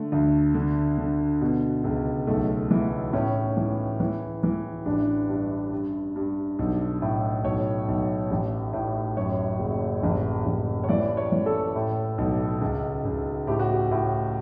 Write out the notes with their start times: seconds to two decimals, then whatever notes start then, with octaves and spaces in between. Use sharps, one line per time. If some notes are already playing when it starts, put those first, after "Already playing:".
Already playing: D3 A3
0.12 D2
0.55 D3
0.98 D3
1.41 B2
1.84 C#2
2.27 B1 A3
2.71 E3
3.13 A2 C#4
3.57 E3
4.00 E3
4.43 E3
4.86 A1 D4
5.29 G2
5.72 G2
6.16 G2
6.59 B1
7.02 A2
7.44 B1 C#5
7.88 B1
8.31 A1
8.73 A2
9.17 F#2 C#5
9.59 F#1
10.03 A1
10.46 A1
10.84 C#5
10.89 E3 D5
11.17 C#5
11.32 E3
11.46 A4
11.75 A2
12.18 B1
12.61 C#2
13.05 C#2
13.47 A2 G4
13.59 F#4
13.70 G4
13.91 A2